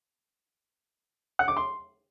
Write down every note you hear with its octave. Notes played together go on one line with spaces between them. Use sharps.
F#5
D6
C6